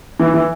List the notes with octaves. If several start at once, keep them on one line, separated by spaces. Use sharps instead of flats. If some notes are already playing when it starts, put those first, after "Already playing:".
E3
E3